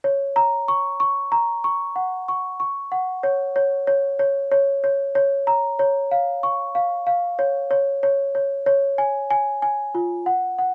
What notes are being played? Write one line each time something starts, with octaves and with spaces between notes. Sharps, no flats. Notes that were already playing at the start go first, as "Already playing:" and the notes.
C#5
A#5
C#6
C#6
A#5
C#6
F#5
C#6
C#6
F#5
C#5
C#5
C#5
C#5
C#5
C#5
C#5
A#5
C#5
F5
C#6
F5
F5
C#5
C#5
C#5
C#5
C#5
G#5
G#5
G#5
F4
F#5
F#5